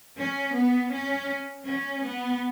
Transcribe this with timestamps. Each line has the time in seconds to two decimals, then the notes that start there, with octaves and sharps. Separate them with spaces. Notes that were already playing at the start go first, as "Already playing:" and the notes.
0.18 C#4
0.55 B3
0.91 C#4
1.65 C#4
2.02 B3